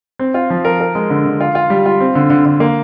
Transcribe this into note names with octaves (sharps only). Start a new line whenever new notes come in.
C4
F4
F3
A#4
A#4
G#3
D3
D3
F4
F4
G3
F4
C4
D3
D3
D3
A#3